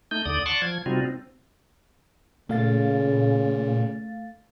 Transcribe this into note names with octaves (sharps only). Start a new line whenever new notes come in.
A3 D#4 G6
D#2 D3 D5 D#6
D5 F#5 A5 C6 C#6
F3 G#6
C3 G3 C4 D#4 F4 F#4
C4
A#2 C#3 A3 F5 A6